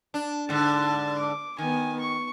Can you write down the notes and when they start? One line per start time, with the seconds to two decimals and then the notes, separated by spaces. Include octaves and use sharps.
0.14 D4
0.49 G#2 D3 A5
1.18 D6
1.58 D#3 B3 G#5
2.00 C#6